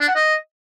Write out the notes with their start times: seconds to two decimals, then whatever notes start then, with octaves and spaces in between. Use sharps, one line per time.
0.01 D4
0.08 F#5
0.15 D#5